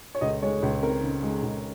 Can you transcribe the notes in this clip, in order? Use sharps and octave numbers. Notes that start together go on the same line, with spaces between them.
C#5
C#2 D#5
G#3 C#5
C#2
C4 A#4
C#3
G#3
C#2